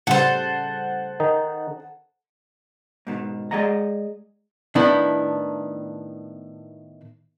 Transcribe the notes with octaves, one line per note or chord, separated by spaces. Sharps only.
A2 C#3 G3 A4 C5 F#5
D#3 D#4
G#2 B2 D#3
G#3 G#4 D5 D#5 F#5 A#5
A2 D#3 B3 D4 E4